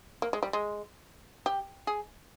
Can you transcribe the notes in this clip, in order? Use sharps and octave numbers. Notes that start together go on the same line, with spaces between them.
A#3
G#3
G3
G#3
G4
G#4